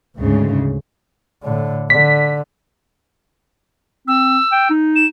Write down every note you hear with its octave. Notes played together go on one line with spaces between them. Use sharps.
D2 G#2 C#3
A2 D3
D3 B6
C4 E6
G5
D#4
E7